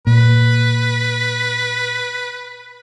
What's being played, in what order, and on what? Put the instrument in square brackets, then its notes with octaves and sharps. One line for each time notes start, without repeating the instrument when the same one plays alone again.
[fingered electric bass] A#2 [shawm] B4